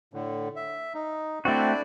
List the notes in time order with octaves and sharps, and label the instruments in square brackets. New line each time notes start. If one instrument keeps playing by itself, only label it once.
[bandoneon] A2 D3
E5
D#4
[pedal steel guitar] A3 F#4 [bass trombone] C4 [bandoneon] D4 E4 D5